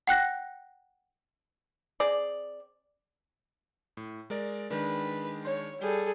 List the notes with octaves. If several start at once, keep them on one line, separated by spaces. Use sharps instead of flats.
F#5 G5 F#6 A#6
C4 G#4 D5
A2
G#3 A#4 D5
D#3 G#3 D4 B4
C#5
G3 G#4 A4